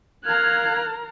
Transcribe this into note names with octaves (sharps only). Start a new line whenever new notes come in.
A#4 F5 A#5 F6 F#6 G#6